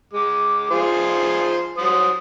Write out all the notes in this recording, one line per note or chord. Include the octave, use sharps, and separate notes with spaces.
G#3 D6
F4 G#4 C5
F#3 C5 D#6